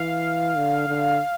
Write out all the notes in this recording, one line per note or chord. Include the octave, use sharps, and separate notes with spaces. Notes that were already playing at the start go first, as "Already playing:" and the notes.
Already playing: E3 F5
D3
D3